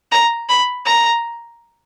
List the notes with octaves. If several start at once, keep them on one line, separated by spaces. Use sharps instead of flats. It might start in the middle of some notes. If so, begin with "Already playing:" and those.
A#5
B5
A#5